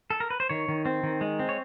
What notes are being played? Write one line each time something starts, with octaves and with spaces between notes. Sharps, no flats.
A4
A#4
B4
C5
D#3 C#5
D#3
C4
D#3
G#3
C4
C#5